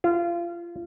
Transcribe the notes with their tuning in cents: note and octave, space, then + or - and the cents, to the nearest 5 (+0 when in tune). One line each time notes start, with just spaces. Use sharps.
F4 -25